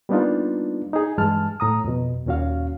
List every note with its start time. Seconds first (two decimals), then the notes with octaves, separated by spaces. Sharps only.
0.09 G3 A#3 B3 D4 D#4 F4
0.93 D#4 G#4
1.18 G2 E3 G#3 A5 F6
1.60 A2 A#5 D#6
1.84 F2 B2
2.26 D#2 A#2 C#4 F#4 F5